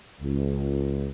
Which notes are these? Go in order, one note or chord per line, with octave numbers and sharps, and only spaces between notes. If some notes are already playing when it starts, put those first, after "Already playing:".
C#2